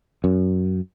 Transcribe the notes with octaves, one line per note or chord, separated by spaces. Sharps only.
F#2